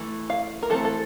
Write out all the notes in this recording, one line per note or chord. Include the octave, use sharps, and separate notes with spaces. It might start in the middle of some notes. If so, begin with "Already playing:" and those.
Already playing: E3 A3
F5
A#4
E3 A3 C4 A4
A4